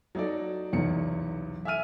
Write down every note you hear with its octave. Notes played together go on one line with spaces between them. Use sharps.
F#3 D#4 A4 D5
B1 E2 C3 C#7
E5 G#5 E6 F6 D#7